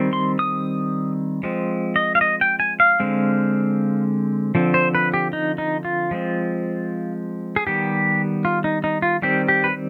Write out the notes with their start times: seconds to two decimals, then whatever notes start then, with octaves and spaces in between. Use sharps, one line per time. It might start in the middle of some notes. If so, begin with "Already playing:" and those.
Already playing: D#3 G3 C4
0.13 C6
0.39 D#6
1.43 F3 G#3 C4
1.96 D#5
2.15 F5
2.21 D#5
2.41 G5
2.60 G#5
2.80 F5
3.00 D3 G#3 C4
4.55 D3 F3 C4
4.74 C5
4.95 B4
5.14 G4
5.33 D#4
5.58 D#4
5.85 F4
6.11 F3 G#3 C4
7.56 G#4
7.67 D#3 G3 B3 G4
8.45 F4
8.64 D#4
8.84 D#4
9.02 F4
9.22 D#3 G3 C4 G4
9.48 G4
9.64 B4